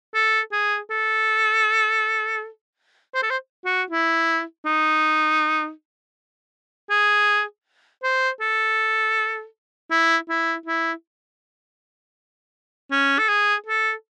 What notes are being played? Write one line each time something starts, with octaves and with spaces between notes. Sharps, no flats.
A4
G#4
A4
C5
A4
C5
F#4
E4
D#4
G#4
C5
A4
E4
E4
E4
C#4
A4
G#4
A4